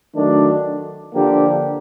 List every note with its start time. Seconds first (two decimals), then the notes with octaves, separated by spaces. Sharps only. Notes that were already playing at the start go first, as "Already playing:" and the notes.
0.14 D#3 F#3 A3 D4
1.13 D3 F3 A#3 D4 G4